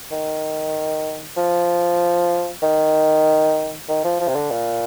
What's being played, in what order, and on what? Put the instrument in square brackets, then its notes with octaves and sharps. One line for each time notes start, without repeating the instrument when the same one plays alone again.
[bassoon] D#3
F3
D#3
D#3
F3
F3
C3
D3
A#2